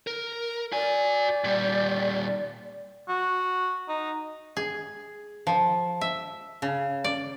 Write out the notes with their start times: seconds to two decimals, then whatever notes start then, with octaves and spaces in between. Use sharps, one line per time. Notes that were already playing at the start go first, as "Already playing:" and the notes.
0.07 A#4
0.72 F#4 D5 G#5
1.44 A#2 G3
3.09 F#4
3.89 D#4
4.57 G#4
5.47 F3
6.01 E5
6.62 C#3
7.04 D5